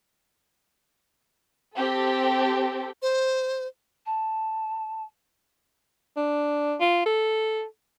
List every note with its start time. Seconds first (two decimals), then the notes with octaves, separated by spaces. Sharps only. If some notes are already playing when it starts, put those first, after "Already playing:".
1.76 C4 G4 A4
3.02 C5
4.05 A5
6.17 D4
6.80 F4
7.06 A4